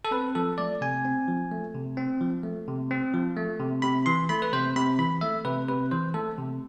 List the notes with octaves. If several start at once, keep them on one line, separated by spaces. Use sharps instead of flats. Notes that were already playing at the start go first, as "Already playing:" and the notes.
A4
C4 B4
F3 A4
A3 D5
C3 G#5
C4
F3
A3
C3
C4
F3
A3
C3
C4
F3
A3
C3
C3 B5
E3 C6
A3 B5
B4
C3 C5
C3 B5
E3 B5
A3 E5
C3 B4
C3 B4
E3 C5
A3 A4
C3